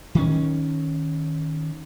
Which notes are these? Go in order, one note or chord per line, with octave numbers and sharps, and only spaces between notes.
D#3 C#4